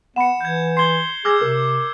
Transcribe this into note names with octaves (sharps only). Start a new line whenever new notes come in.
B3 F#5 B5 C#7 E7
E3 G6 G#6
C6 G#6 C7 G7
G#4 D6 E6 F6 G#6 A#6
C3 A#4